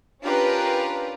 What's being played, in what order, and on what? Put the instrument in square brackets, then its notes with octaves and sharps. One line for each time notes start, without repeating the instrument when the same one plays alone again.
[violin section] C#4 D4 F4 G4 A#4 B4